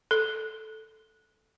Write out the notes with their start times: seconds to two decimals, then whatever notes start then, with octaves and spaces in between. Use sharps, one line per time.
0.11 A4